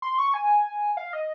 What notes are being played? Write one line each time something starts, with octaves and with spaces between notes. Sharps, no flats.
C6
C#6
G#5
F5
D#5